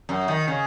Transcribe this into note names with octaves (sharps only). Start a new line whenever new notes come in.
F#2
D#3
C#3